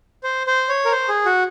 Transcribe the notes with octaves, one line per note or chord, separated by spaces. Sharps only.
C5
C5
C#5
A#4
C5
G#4
F#4